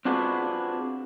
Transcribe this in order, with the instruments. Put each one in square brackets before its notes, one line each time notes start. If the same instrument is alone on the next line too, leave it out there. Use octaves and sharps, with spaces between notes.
[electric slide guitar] C4 D4 F4 F#4 G#4 B4